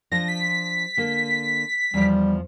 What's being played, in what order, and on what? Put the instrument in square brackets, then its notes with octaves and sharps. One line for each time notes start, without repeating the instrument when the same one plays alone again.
[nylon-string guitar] F3 D4 F4 [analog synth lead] A#6
[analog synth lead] B6
[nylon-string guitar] D3 A#3
[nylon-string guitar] E2 F3 [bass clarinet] G3